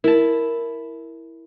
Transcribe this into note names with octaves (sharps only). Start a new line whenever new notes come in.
E4 A#4 A5